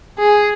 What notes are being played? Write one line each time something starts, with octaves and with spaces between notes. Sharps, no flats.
G#4